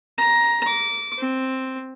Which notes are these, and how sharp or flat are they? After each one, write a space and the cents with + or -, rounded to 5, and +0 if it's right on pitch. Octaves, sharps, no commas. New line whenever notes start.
A#5 +15
D6 -20
C4 +5